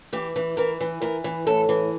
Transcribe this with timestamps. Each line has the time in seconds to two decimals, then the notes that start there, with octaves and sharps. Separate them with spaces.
0.13 E3 G4
0.36 E3
0.57 E3 A#4
0.80 E3
1.02 E3 A#4
1.24 E3
1.47 A2 A4
1.69 E3